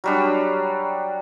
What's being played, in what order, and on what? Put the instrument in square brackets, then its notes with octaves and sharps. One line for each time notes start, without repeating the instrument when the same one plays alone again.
[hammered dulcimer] F#3 G3 D4